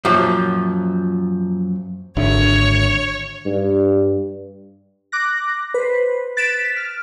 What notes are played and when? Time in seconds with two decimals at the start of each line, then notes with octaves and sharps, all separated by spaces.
0.05 F#2 A#2 F3
2.17 G#1 D3 C#5 E5
3.45 G2
5.12 D6 F#6 A#6
5.74 B4 C5
6.37 F#6 A6 B6 D7 E7
6.77 F6